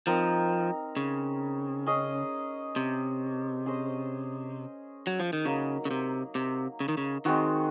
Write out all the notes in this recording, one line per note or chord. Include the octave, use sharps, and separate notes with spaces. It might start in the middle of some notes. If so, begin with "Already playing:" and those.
F3 C4 D#4 A#4
C#3
C#4 G#4 D#5
C3
C#4 G#4 C5 D#5
F#3
F3
D#3
C#3 F#3 A#3 D#4
C#3
C3
C3
C#3
D#3
C#3
D#3 G#3 C4 F#4